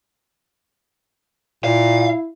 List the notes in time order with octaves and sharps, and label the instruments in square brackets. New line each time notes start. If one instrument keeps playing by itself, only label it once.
[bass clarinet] A#2 [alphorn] E4 [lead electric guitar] F5